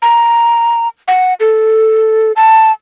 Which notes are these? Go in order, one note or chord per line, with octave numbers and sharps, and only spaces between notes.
A#5
F#5
A4
A5